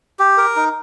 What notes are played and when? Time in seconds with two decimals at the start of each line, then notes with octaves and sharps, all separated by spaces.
0.19 G4
0.38 A#4
0.56 D#4